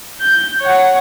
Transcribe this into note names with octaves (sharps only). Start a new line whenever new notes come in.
G6
C#5 F#5